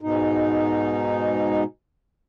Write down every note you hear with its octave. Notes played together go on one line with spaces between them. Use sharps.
G#2 B2 D#4